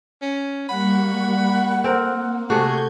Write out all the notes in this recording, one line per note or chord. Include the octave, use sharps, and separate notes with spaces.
C#4
G3 A#3 F#5 B5 C#6
A#3 C4 A#4
C3 A3 F#4 G#4 G6 G#6